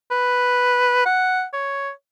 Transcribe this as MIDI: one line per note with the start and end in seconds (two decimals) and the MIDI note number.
0.11 1.02 71
1.06 1.45 78
1.53 1.91 73